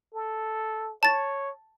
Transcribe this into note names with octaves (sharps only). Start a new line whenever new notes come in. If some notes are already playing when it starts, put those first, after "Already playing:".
A4
C#5 A5 A6